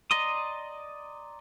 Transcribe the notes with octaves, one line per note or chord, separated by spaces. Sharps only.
D5 D#5 A#5 C6 D#6